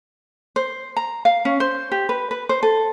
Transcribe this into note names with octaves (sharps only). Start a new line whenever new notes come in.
C5
A#5
F5
C#4
C5
G4
B4
B4
C5
A4